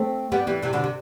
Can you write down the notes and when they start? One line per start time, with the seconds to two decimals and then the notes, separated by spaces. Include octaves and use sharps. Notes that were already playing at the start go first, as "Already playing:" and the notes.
Already playing: A3 C4
0.32 G3 B3
0.47 E3 G3
0.62 C3 E3
0.73 B2 D3
0.84 C3